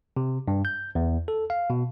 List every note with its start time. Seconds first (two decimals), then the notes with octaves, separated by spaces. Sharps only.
0.17 C3
0.48 G2
0.65 G6
0.95 E2
1.28 A4
1.50 F5
1.70 B2